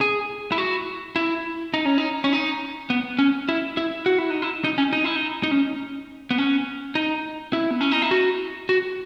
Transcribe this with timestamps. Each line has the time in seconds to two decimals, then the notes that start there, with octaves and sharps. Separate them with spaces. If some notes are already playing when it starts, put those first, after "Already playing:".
0.01 G#4
0.52 E4
0.58 F#4
1.16 E4
1.74 D#4
1.85 C#4
1.98 D#4
2.24 C#4
2.33 D#4
2.90 B3
3.19 C#4
3.49 E4
3.77 E4
4.06 F#4
4.18 E4
4.30 D#4
4.42 E4
4.64 D#4
4.78 C#4
4.93 D#4
5.04 E4
5.16 D#4
5.43 D#4
5.51 C#4
6.31 B3
6.38 C#4
6.95 D#4
7.53 E4
7.71 B3
7.81 C#4
7.92 D#4
8.02 E4
8.11 F#4
8.69 F#4